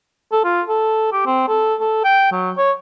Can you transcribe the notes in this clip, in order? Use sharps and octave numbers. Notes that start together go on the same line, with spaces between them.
A4
F4
A4
G4
C4
A4
A4
G5
F#3
C#5